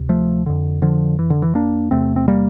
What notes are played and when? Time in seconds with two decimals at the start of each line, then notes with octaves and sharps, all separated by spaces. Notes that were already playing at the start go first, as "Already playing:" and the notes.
Already playing: D2 C3
0.09 F3 A3
0.46 F2 D3
0.82 D3 F3
1.19 E3
1.30 D3
1.42 E3
1.55 A#3 D4
1.91 E2 C3 A3 C4
2.16 C4
2.28 G3 A#3